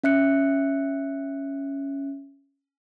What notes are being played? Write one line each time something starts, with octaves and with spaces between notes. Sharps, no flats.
C#4 E5 F#6 C#7